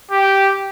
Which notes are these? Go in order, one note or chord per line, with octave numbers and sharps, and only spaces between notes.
G4